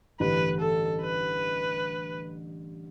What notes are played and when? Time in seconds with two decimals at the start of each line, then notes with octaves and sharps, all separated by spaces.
0.20 A1 G2 D3 G3 B4
0.60 A4
1.02 B4